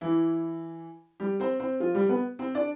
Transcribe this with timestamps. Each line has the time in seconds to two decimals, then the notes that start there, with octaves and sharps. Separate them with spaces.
0.01 E3 E4
1.20 G3 G4
1.40 C4 C5
1.60 C4 C5
1.80 F3 F4
1.94 G3 G4
2.09 B3 B4
2.39 C4 C5
2.55 D4 D5